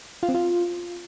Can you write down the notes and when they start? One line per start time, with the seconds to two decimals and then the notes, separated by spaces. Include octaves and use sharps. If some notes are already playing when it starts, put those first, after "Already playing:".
0.23 F4
0.29 C4
0.34 F4